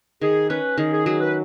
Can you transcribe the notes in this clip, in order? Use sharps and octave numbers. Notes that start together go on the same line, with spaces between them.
D#3 G#4
C#4 B4
D#3 G#4
G#4
F#3 G#4
B4